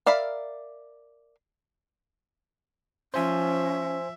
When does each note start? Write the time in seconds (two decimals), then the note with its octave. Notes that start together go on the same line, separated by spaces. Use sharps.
0.06 A#4 D5 E5 F5 B5
3.14 F3 C#4 C5 E5 G#5